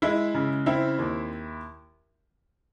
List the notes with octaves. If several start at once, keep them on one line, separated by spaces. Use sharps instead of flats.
G#3 E4 E5
C#3
C4 E4 E5
D#2